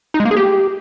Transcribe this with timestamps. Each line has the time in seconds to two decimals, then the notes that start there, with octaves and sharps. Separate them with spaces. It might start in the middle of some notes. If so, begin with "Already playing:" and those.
0.14 D#4
0.20 G#3
0.25 A#3
0.31 G#4
0.37 G4